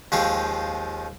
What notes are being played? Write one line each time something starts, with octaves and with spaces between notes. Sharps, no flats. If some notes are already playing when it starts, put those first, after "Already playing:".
D#2 F3 G#3 F4 G4 C#6